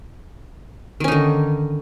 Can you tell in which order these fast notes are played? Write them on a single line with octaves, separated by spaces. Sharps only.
D#3 C#4 D#4 D3